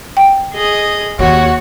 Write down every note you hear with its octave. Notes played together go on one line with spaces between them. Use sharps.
G5
G#4 D#5
D#2 F#4 C#5